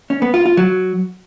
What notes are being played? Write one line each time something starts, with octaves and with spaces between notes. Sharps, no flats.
C#4
B3
F4
F4
F#3